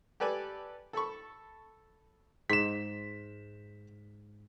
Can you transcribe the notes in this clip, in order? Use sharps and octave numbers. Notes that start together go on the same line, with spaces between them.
G4 A4 B4 D5 G#5
A4 A5 B5 C#6
G#2 B6 E7